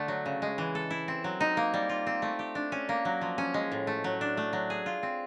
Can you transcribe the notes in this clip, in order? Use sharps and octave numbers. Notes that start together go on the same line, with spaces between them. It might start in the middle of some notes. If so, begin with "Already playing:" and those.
Already playing: D3 A3
F#3
C#3
G#3
E3
A4
E4
C4
F#3
D#4
A#3
G3
F4
C4
A3
G4
D4
C#4
A#3
F#3
F3
C#4
G#3
A2
A3
F#3
D4
A3
F#3
G#4
F4
C4